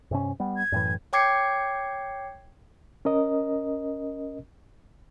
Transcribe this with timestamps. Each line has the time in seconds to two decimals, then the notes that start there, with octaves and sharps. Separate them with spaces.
0.11 G2 C3 C#4
0.40 G3 B3
0.57 G#6
0.72 F#2 A2 E3
1.13 C#5 G5 D6 G#6 C7 C#7
3.05 C#4 A#4 D#5